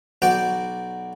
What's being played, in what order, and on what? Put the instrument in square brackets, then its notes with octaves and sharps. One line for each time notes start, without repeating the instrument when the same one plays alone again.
[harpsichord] B1 F#4 D5 G5